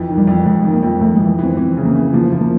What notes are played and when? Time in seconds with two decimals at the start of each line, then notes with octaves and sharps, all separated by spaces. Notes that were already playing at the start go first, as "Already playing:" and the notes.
Already playing: F2 E3
0.09 D#3
0.18 G3
0.27 F2
0.46 F2 G#3
0.64 D#3
0.73 A#3
0.83 F2
1.01 F2 A3
1.16 E3 G#3
1.39 E3 C4
1.57 E3 C4
1.77 C#3
1.86 A#3
1.96 E3
2.13 F3 A#3
2.32 F3
2.41 A#3